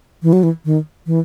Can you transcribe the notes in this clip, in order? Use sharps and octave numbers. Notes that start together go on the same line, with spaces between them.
E3
F#3
E3
D#3
E3